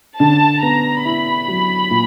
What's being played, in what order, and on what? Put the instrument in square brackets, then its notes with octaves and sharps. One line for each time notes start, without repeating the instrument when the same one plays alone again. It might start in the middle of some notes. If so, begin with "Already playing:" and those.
[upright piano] D3 [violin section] A5
[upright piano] B3 [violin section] A#5
[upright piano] E4 [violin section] B5
[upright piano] F#3
A#2